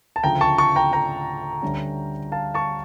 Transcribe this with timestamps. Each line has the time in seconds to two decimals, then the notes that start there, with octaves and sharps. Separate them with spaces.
0.16 A5
0.24 D2 C#3 F3 G5 A#5
0.41 A5 C#6
0.58 A5 C#6
0.76 G5 A#5
0.93 G5 A#5
1.62 D2 D3 G3 C#4
2.32 F5 A5
2.55 A5 C#6